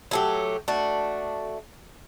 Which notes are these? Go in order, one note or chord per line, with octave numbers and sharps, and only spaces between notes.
F#3 A3 G4
A3 D4 F#4